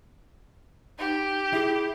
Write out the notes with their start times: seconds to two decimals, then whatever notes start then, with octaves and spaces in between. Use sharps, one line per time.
0.99 D#4 G4
1.53 E4 G#4